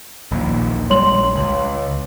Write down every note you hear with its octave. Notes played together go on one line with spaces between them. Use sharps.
A#1 D#2 A#2
A#1 G3 G#3 C#5 C6 F#7
C#2